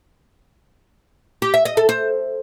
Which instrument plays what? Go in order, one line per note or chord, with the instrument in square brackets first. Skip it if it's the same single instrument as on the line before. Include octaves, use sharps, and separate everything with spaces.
[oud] G4
E5
D#5
A4
C5